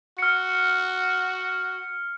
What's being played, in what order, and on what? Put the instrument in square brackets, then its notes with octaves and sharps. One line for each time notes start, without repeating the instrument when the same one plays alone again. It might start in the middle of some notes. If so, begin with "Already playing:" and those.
[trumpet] F#4 [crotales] F6 C#7